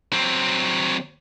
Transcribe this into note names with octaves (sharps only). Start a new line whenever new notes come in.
F#3 C4